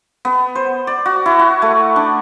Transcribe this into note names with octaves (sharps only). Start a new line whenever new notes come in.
B3
C5
D5
F#4
E4
F#4
A3
D4